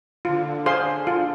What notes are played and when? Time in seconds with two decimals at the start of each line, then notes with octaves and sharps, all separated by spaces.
0.25 D3 F4
0.66 G#4 C5 F5 C6
1.07 F4